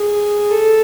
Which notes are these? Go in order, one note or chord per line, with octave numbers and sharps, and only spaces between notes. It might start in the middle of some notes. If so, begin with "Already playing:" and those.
Already playing: G#4
A4